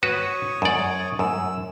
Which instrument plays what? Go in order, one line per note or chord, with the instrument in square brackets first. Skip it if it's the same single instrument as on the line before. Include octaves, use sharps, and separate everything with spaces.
[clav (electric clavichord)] F#4 B4 [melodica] C#5 D#6
[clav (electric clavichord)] F#2 D5
[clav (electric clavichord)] F#2 [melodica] E6